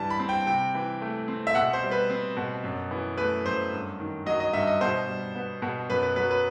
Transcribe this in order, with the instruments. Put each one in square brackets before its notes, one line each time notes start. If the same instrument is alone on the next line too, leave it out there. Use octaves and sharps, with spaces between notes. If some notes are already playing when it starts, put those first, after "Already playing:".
Already playing: [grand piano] G2 E3 G3 A5
B5
C4
G5
C3 G5
E3
A3
C4
E5
B2 F#5
C5
G3
B4
C4
B2
F#2
E3
A3 B4
F#2 C5
G2
D#3
F#3 D#5
D#5
G2 E5
D#5
B2 C5
G3
B3
B2
F#2 B4
B4
F#3 B4
B4